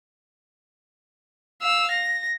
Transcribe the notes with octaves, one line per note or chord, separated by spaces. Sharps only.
F5 E6
A#6